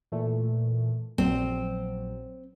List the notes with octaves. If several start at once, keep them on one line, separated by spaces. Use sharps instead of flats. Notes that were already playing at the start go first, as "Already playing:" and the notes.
A#2 E3 A3
A#1 F#3 C4